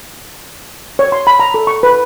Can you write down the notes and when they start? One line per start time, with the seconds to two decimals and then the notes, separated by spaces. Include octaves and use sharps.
0.99 C#5
1.12 C6
1.27 B5
1.40 A#5
1.54 A4
1.67 C#6
1.83 B4